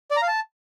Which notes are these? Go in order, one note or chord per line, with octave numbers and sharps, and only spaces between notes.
D5
A#5
F5
A5